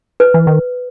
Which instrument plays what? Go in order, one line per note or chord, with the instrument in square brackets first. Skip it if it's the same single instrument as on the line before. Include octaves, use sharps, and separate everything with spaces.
[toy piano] B4
[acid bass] E3
D#3